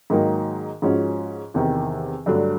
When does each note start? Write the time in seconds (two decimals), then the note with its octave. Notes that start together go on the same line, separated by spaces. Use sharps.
0.10 G#2 D#3 F#3 A#3 D#4
0.82 G#2 F3 G#3 C#4 F#4
1.54 E2 C3 D#3
2.26 G2 D3 F#3 A3 D4